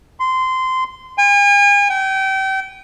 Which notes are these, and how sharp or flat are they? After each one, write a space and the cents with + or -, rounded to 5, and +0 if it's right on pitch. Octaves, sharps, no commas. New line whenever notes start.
C6 -20
G#5 -40
G5 -30